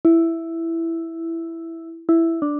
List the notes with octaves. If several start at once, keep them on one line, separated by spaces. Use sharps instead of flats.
E4
E4
D4